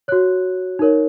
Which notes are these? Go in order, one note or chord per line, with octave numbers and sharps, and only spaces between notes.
F#4 C#5 F#6
D#4 A#4 C#5